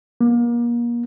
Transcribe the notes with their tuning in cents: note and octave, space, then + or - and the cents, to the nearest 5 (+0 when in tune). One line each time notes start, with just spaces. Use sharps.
A#3 +35